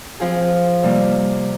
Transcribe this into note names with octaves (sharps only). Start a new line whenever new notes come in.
F3 C4 F4 G#4
C3 G3 A#3